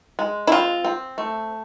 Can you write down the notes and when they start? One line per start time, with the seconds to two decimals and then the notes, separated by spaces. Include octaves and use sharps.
0.19 G#3
0.47 E4
0.52 C4 F4
0.85 C4
1.18 A3